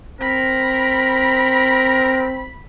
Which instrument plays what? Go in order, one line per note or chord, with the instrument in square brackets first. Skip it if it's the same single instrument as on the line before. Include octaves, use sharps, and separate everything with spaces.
[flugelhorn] C4 [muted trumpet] A#4 [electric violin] B5